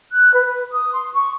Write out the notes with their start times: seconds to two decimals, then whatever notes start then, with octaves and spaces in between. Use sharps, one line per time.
0.13 F#6
0.33 B4
0.45 B4
0.73 D#6
0.93 C6
1.14 C#6